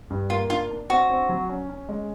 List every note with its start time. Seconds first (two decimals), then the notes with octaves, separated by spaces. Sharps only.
0.10 G2
0.30 A#3 F4
0.50 D4 F4
0.70 D4
0.89 C4 F#4
1.10 C4
1.29 F#3
1.49 C#4
1.69 C#4
1.89 G#3